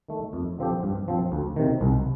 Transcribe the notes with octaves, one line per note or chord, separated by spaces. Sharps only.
D#3 A3
F2
D3 F3 C4 G4
G2
F3 C4
D2
C3 D#3
C2